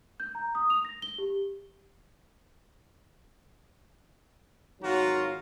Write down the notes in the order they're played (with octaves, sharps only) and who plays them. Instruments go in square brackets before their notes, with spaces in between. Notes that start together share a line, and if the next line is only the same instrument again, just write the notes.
[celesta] G6
A#5
D#6
F7
A#6
G7
G4
[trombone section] G#1 D#3 F#3 [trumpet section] F4 F#4 A#5